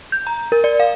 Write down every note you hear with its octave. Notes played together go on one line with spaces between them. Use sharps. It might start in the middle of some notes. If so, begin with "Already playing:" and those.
G6
A#5
A#4
D5
F5